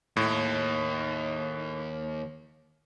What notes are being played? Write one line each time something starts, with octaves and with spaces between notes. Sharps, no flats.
D#2 A2